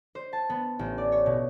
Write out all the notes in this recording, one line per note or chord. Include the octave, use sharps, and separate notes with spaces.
C5
A5
B3
A1
D5
C#5
B2